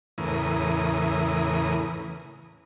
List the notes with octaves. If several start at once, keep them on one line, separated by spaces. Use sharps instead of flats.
E2 A2 C#3 E3 A#4 D#6